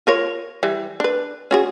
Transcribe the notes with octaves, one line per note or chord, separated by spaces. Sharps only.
F4 A#4 C#5
E3 G3
D4 B4
C#4 F#4 G#4